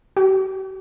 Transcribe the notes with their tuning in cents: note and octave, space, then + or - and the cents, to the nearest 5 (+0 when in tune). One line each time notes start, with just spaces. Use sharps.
G4 -45